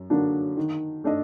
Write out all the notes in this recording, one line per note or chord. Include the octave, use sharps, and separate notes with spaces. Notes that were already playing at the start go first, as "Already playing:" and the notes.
Already playing: F#2
D3 F#3 A#3 D4
D#3
A3 D4 A4 D#5